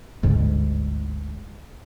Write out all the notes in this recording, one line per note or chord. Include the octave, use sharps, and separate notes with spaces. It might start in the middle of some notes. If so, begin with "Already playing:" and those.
G1 D2 G#2